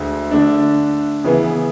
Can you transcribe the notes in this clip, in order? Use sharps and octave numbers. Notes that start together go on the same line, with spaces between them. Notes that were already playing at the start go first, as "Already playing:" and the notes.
Already playing: D2 D3 G#3
D3 A3 D4
C#3 E3 B3